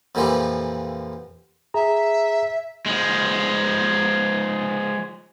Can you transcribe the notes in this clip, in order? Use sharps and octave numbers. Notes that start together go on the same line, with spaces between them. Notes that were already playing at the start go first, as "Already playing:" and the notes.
F2 A#2 D3 E3 F3 G3
G#4 E5 A#5
F3 G#3